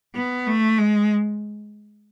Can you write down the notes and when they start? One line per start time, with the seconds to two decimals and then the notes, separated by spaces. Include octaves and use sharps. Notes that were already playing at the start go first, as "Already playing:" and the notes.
0.15 B3
0.47 A3
0.79 G#3